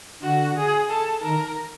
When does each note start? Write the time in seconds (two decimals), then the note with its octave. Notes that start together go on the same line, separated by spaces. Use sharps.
0.22 D3 F#4
0.56 G#4
0.89 A4
1.23 D#3 A#4